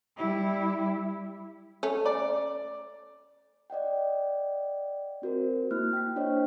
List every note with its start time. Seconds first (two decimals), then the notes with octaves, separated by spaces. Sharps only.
0.17 G3 E4
1.83 A3 C#4
2.06 D5
3.70 D5 D#5 F#5 G5
5.22 C4 F#4 A#4 C5
5.71 A#3 E4 F6 F#6
5.93 G5 B6
6.16 D4 C5 C#5 D#5 G5